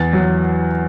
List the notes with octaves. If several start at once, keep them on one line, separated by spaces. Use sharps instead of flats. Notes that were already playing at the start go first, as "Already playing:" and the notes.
Already playing: E2 A6
F#3